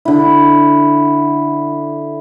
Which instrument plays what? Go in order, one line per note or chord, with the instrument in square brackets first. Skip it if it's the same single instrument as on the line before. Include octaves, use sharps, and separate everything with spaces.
[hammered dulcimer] D3 E4